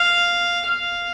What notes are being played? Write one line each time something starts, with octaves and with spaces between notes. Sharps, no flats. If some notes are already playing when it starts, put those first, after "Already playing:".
Already playing: F5
F5